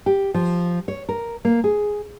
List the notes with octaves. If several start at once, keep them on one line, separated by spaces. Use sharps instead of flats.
G4
F3
C#5
A#4
A#3
G#4